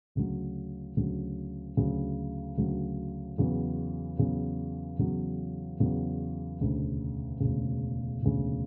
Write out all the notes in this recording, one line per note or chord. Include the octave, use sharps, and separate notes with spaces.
D2 C#3 F#3
D2 C#3 F#3
D2 C#3 F#3
D2 C#3 F#3
E2 C#3 F#3
E2 C#3 F#3
E2 C#3 F#3
E2 C#3 F#3
E1 D2 C#3
E1 D2 C#3
E1 D2 C#3